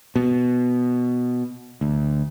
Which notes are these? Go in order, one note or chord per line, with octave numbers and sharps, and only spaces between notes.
B2
D2